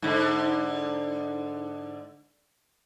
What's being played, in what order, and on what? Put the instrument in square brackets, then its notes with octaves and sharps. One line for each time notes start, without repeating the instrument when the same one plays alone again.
[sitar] G#2 D3